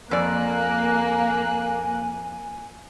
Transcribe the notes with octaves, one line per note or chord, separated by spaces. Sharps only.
F2 A#3 D5 G#5 F#6